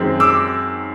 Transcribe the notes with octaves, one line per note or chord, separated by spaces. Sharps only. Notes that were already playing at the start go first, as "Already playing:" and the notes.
Already playing: F#2 D#3 G#3 C4
D6 E6